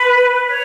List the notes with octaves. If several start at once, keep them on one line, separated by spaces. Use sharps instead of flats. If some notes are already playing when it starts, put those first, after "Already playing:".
Already playing: B4
C#5